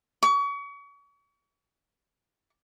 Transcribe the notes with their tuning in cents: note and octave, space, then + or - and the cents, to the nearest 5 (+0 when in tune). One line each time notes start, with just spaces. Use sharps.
C#6 +35